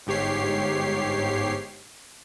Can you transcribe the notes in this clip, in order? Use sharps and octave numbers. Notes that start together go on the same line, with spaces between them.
G1 G#2 G4 C#5 C7